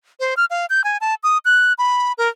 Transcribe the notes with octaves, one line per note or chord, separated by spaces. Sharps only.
C5
F6
F5
G6
G#5
A5
D#6
F#6
B5
A#4